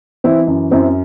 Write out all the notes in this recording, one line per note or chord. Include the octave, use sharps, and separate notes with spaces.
E3 C4 E4
F#2
F#2 C4 E4